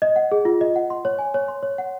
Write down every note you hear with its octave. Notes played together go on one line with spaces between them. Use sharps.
D#5
F#5
G#4
F4
D#5
F#5
C6
C#5
G#5
C#5
C6
C#5
F#5